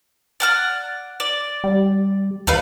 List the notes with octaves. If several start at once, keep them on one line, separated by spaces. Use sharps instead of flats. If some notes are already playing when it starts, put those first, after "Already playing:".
D5 F#5 F6
D5
G3
D#2 A3 B4 F5